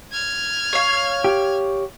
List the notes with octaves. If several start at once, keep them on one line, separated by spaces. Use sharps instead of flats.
F6 G#6
C#5 F5
G4